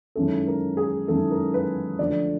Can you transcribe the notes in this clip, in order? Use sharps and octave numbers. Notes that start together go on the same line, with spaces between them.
F#2 D#3 G#3 C#4 E4 A4
A#4
G#4
F#2 D#3 G#3 C#4 E4 A4
A#4
B4
D3 F3 A3 D4 D5